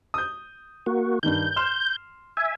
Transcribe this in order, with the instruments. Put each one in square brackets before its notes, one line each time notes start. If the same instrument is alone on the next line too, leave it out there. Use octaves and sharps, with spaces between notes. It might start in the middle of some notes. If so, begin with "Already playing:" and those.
[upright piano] D#6 G6
[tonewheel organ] A#3 F#4
[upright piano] G2 D#3 [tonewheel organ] G6
[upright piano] C6 F6 E7
[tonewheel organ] E5 G#5